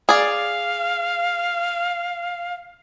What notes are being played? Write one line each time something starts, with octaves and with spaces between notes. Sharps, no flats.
G#4 D5 F5